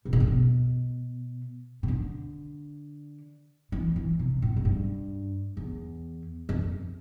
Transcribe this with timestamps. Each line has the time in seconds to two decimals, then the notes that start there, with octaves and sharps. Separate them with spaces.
0.05 C3
0.13 B2
0.20 A2
0.27 B2
1.83 C3
1.88 D3
3.72 E3
3.96 E3
4.19 C3
4.42 A2
4.56 A2
4.65 G2
5.57 E2
6.49 F2